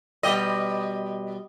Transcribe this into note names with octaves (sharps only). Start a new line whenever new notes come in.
B2 G3 D#5